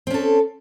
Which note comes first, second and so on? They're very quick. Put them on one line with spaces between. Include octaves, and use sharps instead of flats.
C4 C#4 A4